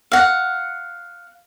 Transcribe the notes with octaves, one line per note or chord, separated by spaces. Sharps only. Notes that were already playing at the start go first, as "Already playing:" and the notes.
F5 F#5